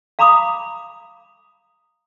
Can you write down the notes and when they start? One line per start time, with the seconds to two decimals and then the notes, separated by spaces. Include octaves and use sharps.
0.19 F5 A#5 B5 D6 D#6